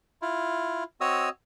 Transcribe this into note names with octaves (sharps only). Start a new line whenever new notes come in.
E4 F4
C4 F#4 C#5 D#5 D#6 E6